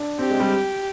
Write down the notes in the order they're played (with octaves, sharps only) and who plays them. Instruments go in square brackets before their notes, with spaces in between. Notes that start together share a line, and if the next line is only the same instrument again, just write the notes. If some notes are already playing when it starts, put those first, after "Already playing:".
Already playing: [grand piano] D4
[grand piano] C4 [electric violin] G4
[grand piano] G#3
G3